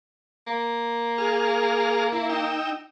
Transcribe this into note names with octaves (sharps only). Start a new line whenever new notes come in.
A#3
G#4 F6
E4
D#4 G5 E6